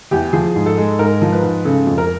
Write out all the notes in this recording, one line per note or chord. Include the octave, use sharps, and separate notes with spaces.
E2 G4
F3 G#4
G#2
A4
G#3
G#2 A#4
F3
B4
G#2
C#3 A4
F2
A#4